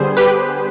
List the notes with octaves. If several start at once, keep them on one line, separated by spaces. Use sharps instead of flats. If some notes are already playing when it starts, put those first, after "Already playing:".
Already playing: D3 G3 B3 G#4 C5
G4 B4